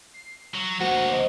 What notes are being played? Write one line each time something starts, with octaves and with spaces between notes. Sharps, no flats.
C7
F#3
D2 A#2 F#4 C5
C5 D#5